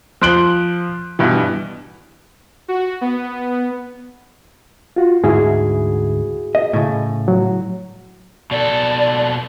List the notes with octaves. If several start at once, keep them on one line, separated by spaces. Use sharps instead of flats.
F3 C6 F#6 D7 F#7 G7
G2 B2 E3
F#4
B3
F4 F#4
D2 G#2 E4 F#4 G#4
D#5
A2 C#3
F#3
B2 A4 D5